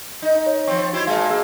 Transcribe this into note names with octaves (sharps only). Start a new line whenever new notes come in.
D#4
C#5
F3 C4 C#6
E4 F#4 G4 C5 G#6
A#2 G#3 F5 A5
A#3 G#4 E6